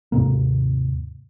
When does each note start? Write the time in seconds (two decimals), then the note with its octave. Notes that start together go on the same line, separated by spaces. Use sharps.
0.12 D#2 G#2 C3 A#3